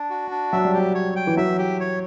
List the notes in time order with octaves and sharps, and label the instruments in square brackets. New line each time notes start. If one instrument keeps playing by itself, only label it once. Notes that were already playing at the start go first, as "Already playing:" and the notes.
Already playing: [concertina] D4
F#4
D4
[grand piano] F#3 [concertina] E5
[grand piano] G3
[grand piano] F#3 [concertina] G4
[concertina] C#5
G5
[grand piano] E3
[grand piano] F#3 [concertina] E5
[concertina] G4
C#5